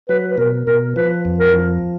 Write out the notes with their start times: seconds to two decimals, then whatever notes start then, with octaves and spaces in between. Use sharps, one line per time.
0.09 F#3 B4
0.31 B4
0.38 B2 A#4
0.67 B2 A#4
0.96 F3 B4
1.25 F2
1.40 A#4
1.54 F3